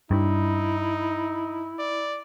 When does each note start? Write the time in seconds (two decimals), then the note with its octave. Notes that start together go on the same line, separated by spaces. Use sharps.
0.11 G2 D#4 E4
1.79 D5